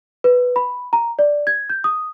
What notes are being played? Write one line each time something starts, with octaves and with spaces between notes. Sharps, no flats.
B4
B5
A#5
D5
G#6
G6
D#6